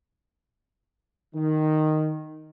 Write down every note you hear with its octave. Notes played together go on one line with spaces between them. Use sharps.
D#3